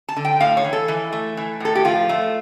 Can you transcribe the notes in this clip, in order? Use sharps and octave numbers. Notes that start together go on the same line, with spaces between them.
A5
D3
G5
A2 F5
C#5
E3
A4
E3
A3
E3
A2 A4
G4
F3 F4
A3